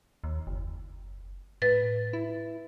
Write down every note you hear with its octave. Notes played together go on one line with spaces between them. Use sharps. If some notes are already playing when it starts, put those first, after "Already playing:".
D#2
F#1
A2 B4 A6
E4